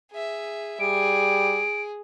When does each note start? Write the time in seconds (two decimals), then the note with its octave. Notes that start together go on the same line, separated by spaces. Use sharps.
0.11 G#4 E5
0.80 G3 G#4 D7